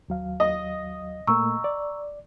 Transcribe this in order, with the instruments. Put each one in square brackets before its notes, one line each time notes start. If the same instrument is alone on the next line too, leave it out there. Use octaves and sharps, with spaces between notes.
[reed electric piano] D#2 F#3 F5
[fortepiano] D#5
[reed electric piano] A#2 A3 A#3 [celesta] A#5 C#6 E6
[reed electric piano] D5